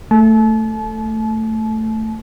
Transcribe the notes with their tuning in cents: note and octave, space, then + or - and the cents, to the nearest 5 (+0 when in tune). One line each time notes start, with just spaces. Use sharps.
A3 +10 A5 -35